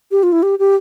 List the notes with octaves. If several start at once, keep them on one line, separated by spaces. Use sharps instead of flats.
G4
F4
E4
G4
G4